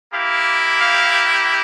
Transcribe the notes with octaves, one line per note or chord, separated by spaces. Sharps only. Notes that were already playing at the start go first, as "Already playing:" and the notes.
A#3 E4 G4 F5
F5